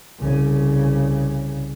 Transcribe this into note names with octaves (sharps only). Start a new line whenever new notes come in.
C2 C#3